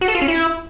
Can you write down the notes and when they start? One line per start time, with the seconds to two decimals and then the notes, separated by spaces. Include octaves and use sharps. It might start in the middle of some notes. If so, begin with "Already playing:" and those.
0.01 F#4
0.08 A4
0.15 F4
0.22 C#4
0.28 E4